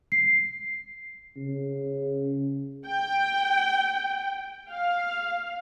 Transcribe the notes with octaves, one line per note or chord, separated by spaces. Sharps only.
C7
C#3
G5
F5